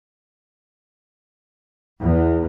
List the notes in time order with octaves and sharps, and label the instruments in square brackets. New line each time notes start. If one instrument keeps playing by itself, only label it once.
[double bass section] E2